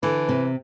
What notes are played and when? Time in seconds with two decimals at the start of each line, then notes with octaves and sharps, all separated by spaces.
0.03 D3 E3
0.29 C3